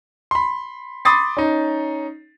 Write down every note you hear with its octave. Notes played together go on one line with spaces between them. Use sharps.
B5 C6
B5 C6 D6 D#6 A6 C7
C#4 D#4